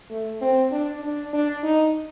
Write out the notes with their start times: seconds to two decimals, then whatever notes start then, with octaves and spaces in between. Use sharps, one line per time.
0.10 A3
0.41 C4
0.72 D4
1.02 D4
1.33 D4
1.63 D#4